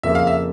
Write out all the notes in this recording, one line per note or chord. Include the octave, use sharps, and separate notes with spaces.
F2 C#3 F3 A#3 E5
F5
E5